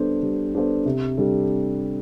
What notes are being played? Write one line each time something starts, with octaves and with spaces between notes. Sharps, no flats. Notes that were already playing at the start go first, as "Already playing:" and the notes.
Already playing: G3 B3 D4 A4 C5
G3
B3 D4 A4 C5
C3
G3 D4 A4